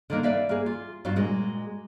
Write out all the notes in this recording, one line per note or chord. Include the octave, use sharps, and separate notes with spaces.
D3 D#3 A#3 B3
B4 D5 E5 F5
A#3 G#4
F4
G2 F#3 C4 F4 F#4
A#2 G#3 F#4